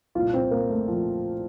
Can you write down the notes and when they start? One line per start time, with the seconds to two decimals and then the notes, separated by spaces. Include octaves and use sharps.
0.15 C2 A#2 F4
0.34 C4
0.51 A#3
0.70 A3
0.88 F3